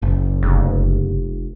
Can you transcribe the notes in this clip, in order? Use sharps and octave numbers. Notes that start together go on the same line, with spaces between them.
F#1
F1